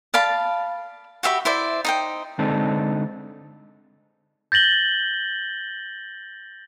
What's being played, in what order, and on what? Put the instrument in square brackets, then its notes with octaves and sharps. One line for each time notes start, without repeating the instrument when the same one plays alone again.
[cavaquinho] D5 F5 A5 B5
F#4 G4 E5 B5
E4 C5 D5 E5
D#4 C5 G5
[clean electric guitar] D3 G#3 C4 D4 D#4 A4
[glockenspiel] G6 A6 A#6 F#7 G7